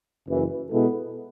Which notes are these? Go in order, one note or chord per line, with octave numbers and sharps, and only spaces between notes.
F#1 F#2 E3
B2 G#3 B3 E4 A4